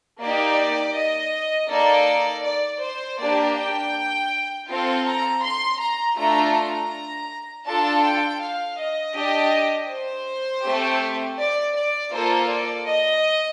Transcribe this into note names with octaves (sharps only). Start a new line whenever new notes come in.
A#3 D#4 G4 D5
D#5
A#3 D#4 A4 D5
D5
C5
A#3 D4 G4 D5
G5
C4 F4 A4 F5
A#5
C6
A#5
A3 D4 F4 A#5
A#5
D4 F4 A4 A5
G5
F5
D#5
D4 G4
C5
A3 C4 G4
D5
D5
A#3 F4 A4 C5
D5
D#5